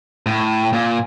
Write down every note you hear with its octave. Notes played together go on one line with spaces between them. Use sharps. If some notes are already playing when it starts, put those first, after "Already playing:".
A2
A#2